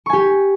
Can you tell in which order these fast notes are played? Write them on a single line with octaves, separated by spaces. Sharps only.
C#6 G#5 G4